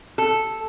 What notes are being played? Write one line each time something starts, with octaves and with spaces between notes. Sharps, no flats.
A4